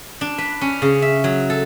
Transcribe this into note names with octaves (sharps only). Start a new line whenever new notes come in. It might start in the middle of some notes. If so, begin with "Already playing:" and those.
D4
B4
C#4
C#3
E5
F#3
A4